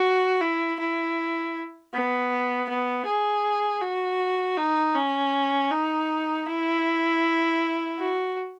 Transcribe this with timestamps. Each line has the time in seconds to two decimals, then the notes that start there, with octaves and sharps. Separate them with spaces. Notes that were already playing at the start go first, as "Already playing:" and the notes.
Already playing: F#4
0.41 E4
0.80 E4
1.94 B3
2.69 B3
3.06 G#4
3.82 F#4
4.58 D#4
4.95 C#4
5.71 D#4
6.47 E4
7.99 F#4